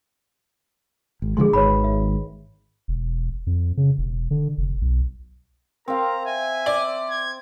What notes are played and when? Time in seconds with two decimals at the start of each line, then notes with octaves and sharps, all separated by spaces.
1.22 G#1
1.37 D3 F3 G#3 G#4 C6
1.53 G#1 D#3 B4 C#5 B5
1.84 E5
2.88 E1
3.47 F2
3.77 C#3
3.98 E1
4.31 D3
4.58 F1
4.82 B1
5.88 C4 A#4 F5 A#5
6.26 E5 G#5
6.66 D5
7.10 G#6